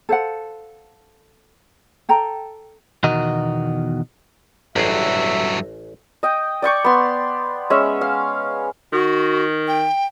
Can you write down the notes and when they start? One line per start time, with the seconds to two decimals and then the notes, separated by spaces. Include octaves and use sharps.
0.09 A4 C5 F5 F#5
2.09 A4 G5 A#5
3.03 E2 B2 D#3 F#4 A#4 D#5
4.76 A1 G2 F#3 G#4 E5
6.23 D#5 G5
6.62 D5 G5 C#6 D6
6.85 B3 C6
7.70 G#3 C#4 C#5 E5
8.01 F5
8.92 D#3 F#4
9.68 G5